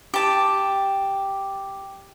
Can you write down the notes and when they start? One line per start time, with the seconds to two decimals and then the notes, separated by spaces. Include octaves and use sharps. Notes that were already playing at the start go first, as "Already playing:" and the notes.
0.14 G4 A5